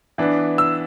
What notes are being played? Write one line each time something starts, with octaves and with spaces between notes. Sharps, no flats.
E3 B3 D4
E6